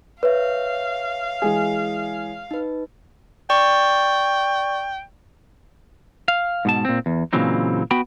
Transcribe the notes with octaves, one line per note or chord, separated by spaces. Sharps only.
B4 C#5 E5 F5
E3 G#3 G#4
D#4 B4
D5 G5 C#6
F5
G#2 B2 A5
A#2 C4
E2
A#2 C#3 E3 F#3 C4 D#4
B3 F#4 G5 B5